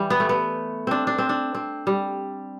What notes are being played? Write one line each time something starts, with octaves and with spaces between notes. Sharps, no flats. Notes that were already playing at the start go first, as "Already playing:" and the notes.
Already playing: E3 G3
B3
A3
B3
C4 D4
D4
C4
D4
C4
G3